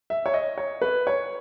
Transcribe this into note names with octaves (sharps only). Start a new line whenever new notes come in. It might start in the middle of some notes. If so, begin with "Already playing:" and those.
E5
C#5
D#5
C#5
B4
C#5